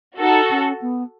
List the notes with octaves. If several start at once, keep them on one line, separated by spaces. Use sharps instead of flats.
D#4 F#4 A4
C#4
B3